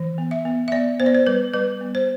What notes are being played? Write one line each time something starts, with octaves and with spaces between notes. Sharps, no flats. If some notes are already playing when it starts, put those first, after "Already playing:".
Already playing: E3
B3
E5
B3
E5
B3 D5
B3 C5
D5
C5
G3 B4
G3 B4
B3
C5